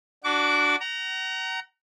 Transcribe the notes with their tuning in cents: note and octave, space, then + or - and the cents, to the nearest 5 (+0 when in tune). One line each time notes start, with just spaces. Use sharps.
D4 +0 F#4 +0 D6 -30
F#5 +40 A#5 +0